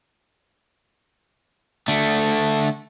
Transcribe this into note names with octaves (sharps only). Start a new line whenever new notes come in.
D3 A3